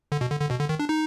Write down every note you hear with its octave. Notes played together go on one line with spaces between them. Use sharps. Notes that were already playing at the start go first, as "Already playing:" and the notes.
D3
B2
D3
D3
B2
D3
D#3
D4
D#4